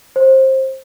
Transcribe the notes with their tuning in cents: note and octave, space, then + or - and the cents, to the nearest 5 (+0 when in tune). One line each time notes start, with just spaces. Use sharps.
C5 +20